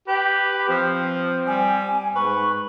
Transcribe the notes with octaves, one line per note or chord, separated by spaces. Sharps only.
G4 B4
F3 C4
G3 G#5
G#2 B4 C#6